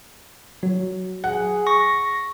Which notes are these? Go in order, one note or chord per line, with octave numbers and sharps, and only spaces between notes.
F#3
G#4 F#5
C#6 A#6